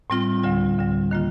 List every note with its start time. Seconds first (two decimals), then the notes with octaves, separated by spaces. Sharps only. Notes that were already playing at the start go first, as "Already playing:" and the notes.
0.10 A2 G3 C4 F4
0.43 D2 D3 G3
0.78 D2 D3 G3
1.11 D#3 A#3 F4